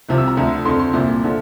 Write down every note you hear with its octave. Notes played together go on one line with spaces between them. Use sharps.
C2 C3 F3
E6
A#5
D2 D3 F3
F2 D3 F3 C6
C6
C2 A#2 F3
D3 F3